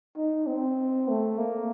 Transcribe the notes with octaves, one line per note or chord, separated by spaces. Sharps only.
D#4
C4
A3
A#3